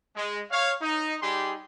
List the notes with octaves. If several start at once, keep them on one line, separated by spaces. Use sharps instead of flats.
G#3
C#5 F5
D#4
G3 D#4 G4 G#4 C6